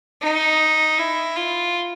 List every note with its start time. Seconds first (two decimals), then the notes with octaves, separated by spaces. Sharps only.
0.22 D#4
0.99 E4
1.36 F4